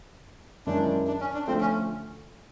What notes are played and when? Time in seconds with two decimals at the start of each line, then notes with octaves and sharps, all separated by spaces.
0.66 F#2 D#3 G#3 C#4 D4 E4
1.08 D4
1.21 C#4
1.34 D4
1.47 D3 F3 A3 C4
1.61 C#4